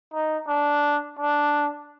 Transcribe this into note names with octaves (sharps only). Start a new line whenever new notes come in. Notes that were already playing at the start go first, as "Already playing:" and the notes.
D#4
D4
D4